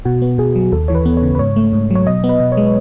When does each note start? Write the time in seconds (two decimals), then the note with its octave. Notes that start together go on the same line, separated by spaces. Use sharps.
0.05 B2 F#4
0.22 B3
0.38 B2 G#4
0.55 F#3
0.72 D#2 A4
0.88 E3 C#5
0.95 B4
1.06 B3
1.17 C#5
1.22 C#3
1.35 B4
1.39 G#2 C#5
1.56 A3
1.73 G#2
1.91 F#3 C#5
2.06 B2 D#5
2.24 B3
2.29 B4
2.40 B2
2.52 C#5
2.57 G#3